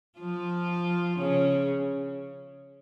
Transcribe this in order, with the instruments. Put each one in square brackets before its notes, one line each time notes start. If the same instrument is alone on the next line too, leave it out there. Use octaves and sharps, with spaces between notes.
[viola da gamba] F3 F4
C#3 C#4